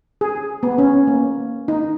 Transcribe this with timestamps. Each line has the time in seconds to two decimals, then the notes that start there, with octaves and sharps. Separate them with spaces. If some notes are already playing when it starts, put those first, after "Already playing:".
0.21 G#4
0.63 B3
0.78 C#4
1.07 A#3
1.68 D#4